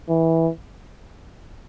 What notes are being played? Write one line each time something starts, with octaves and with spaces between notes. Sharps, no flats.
E3